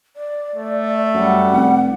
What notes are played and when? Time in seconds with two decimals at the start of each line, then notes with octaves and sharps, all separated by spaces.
0.16 D5
0.55 A3
1.14 F#2 G3 F#5
1.52 F1